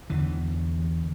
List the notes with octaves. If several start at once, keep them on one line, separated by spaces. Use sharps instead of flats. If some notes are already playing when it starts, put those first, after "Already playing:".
E2 D3 E3